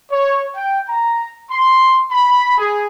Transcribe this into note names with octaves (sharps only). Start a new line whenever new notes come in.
C#5
G5
A#5
C6
B5
G#4